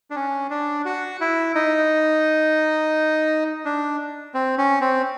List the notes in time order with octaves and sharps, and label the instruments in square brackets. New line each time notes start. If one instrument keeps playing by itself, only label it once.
[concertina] D4
C#4
D4
F#4
E4
D#4
D4
C4
C#4
C4